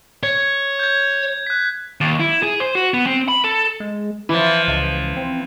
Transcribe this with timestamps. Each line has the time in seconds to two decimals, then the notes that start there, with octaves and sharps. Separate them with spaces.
0.23 C#5 G#6
0.79 G6 G#6
1.47 F#6 B6
2.01 D#2
2.20 E4
2.43 G#4
2.60 C5
2.75 F#4
2.94 B3
3.06 C4
3.28 B5
3.44 A4
3.80 G#3
4.29 E3 F3 E4
4.67 C#2
5.16 C4